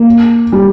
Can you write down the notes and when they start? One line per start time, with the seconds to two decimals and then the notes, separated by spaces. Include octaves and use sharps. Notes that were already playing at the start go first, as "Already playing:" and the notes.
Already playing: A#3
0.52 G3